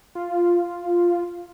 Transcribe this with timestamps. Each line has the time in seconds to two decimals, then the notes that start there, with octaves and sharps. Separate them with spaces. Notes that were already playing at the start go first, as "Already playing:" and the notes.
0.15 F4